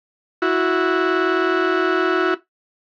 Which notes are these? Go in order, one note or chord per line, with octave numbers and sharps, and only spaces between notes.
E4 F#4